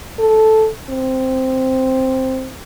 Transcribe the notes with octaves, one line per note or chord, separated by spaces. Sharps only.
A4
C4